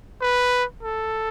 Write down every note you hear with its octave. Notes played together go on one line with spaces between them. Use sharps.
B4
A4